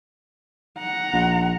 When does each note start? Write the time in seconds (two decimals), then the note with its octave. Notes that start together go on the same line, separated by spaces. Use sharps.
0.78 F#5 A#5
1.13 A#1